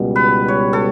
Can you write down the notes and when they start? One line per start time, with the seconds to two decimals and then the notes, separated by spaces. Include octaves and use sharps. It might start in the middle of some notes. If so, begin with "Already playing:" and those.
Already playing: C#2 B2 G3
0.16 B4
0.48 C#5
0.73 A4